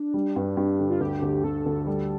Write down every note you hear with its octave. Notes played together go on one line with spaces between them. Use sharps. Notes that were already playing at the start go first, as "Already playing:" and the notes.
Already playing: D4
G3
G2
G2
D3
F4
D2 G4
D2
D2 A4
D2
G3